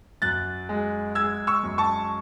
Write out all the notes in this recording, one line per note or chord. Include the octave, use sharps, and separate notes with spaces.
F#2 F#6 A6
G#3
G#3 E6 G#6
C#6 E6
F#2
A5 C#6